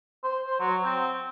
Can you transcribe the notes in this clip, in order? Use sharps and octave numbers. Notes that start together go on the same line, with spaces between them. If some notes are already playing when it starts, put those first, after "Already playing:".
C5
C5
F#3
C4